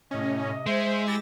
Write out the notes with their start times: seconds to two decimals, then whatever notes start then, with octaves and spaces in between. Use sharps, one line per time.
0.11 A2 C3 C#4 D#5
0.66 G#3 C5 E5
1.06 E4 G4 E6 A6 A#6